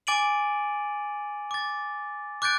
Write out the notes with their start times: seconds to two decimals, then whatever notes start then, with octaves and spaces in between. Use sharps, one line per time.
0.07 G#5 D6 A6 D7 D#7 F#7
1.51 D6 A6
2.42 D6 F#6 G6 A6 D7